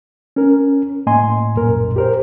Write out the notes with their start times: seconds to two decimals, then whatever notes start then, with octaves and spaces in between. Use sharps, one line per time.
0.36 C#4 A#4
1.06 A2 A#3 D#5 G#5 C6
1.55 C2 F#2 A#2 A#4
1.96 G4 A#4 C5